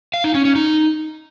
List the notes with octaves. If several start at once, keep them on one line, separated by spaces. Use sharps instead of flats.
F5
D#4
C#4
C#4
D#4